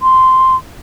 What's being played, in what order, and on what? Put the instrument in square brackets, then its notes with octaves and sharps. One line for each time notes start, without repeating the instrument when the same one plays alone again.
[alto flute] C6